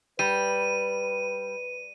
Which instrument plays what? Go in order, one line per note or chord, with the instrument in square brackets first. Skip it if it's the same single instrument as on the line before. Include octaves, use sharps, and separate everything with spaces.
[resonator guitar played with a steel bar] G3 [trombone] B4 [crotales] D#7